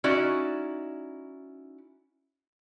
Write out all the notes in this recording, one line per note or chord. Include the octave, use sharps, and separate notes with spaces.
C#4 D#4 E4 F#4 D5